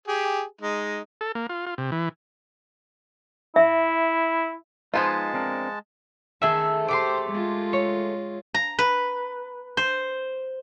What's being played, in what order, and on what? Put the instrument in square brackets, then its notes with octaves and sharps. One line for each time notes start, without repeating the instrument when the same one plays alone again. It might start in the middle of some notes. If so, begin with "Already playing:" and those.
[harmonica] G4 G#4
G#3 D#4
[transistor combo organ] A4
A#3
F4
F4
C3
E3
[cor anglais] E4 [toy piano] E5
[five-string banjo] F3 B3 F4 [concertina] G#3 A5 [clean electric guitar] D#4 C5 G#5
[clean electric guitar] C4 D4 A#4
[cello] D#3 [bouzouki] A3 A4 [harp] G#4 E5
[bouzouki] A3 G4 [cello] C5 [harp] C6 D6
[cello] G#3 F4
[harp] C#5
[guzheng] A#5
B4
C5